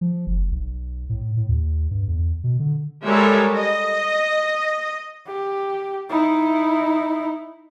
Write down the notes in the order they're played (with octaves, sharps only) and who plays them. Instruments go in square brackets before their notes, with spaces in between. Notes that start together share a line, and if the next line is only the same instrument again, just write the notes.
[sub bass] F3
F#1
B1
A2
A2
D#2
G2
E2
B2
D3
[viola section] G3 G#3 A4 A#4 C#5 E5
D#5
[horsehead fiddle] G4
D#4 E4